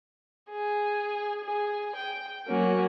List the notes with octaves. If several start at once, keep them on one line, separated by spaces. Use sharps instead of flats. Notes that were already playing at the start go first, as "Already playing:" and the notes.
G#4
G#4
G5
F#3 A#3 C#4 F#4